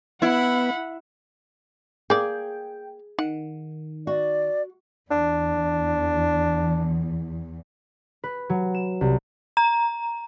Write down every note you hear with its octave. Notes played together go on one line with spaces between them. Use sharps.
B3 E4 F#5 B5
A#3 G#4 D5 G5
D#3 F#5
F#4 D5
E2 D4
B4
F#3
E7
C2
A#5